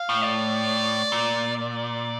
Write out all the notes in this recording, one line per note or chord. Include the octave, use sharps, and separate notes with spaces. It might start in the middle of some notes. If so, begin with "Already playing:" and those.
Already playing: F5
A2
D5
A#2
D5